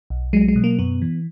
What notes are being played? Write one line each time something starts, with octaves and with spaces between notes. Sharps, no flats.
B1
F#3 G#3
G#3
B2
A#3
F#2 B3
E3